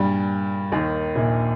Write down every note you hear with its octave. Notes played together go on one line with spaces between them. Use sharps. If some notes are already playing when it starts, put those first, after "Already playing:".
Already playing: G2 A#2 G3
D#2 D#3
A#1 A#2